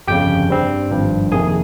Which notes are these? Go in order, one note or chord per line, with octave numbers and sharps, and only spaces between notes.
G1 F2 C#3 G4 G5
G2 G3 C4
G#1 G2 F3
F2 C3 D#3 A#3 G#4 G#5